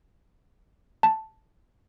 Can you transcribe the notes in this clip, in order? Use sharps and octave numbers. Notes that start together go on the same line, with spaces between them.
A5